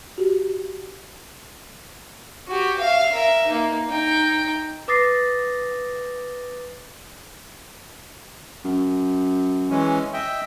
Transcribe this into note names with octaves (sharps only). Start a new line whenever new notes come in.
F#4 G4
F#4 G4
E5 F5
A#4 E5
A#3 D#4
D#4 G5
B4 D6 D#6 A6 A#6 C7
F#2
E3 G#3 C#4
D#5 E5 G5